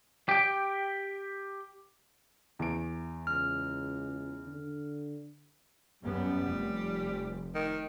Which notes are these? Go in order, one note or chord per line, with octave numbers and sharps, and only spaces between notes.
G4 G5
E2 D7
C#2 F6
D3
F#2 G3 B3
F1
D#3